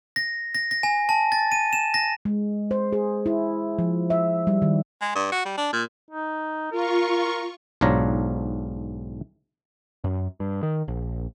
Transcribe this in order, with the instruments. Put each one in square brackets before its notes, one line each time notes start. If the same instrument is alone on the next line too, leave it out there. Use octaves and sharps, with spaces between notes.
[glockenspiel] A#6
A#6
A#6
G#5
A5
A6
D#7
E7
A#6
[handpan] G#3
C5
G#4
E4
F3
E5
G3
D#3
[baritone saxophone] G#3
G2
F#4
G3
D4
A#2
[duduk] D#4
[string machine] F4 C#6 [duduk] A#4
[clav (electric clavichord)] B1 G#2 D4 F4 C#5 A#5
[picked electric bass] F#2
G2
D#3
A#1